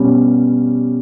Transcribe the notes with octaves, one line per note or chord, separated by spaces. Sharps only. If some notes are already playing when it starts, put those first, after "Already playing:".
Already playing: B2 G3 C#4 G4